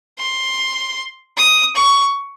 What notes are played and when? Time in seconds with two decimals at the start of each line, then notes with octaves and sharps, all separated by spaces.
0.19 C6
1.37 D#6
1.75 C#6